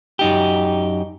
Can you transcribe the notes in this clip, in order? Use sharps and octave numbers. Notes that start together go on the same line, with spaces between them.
F#2 D#4 G4